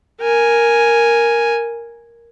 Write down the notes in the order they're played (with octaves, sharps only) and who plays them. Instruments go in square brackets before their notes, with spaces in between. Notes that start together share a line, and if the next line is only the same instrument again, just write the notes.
[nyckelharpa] A#4 G#5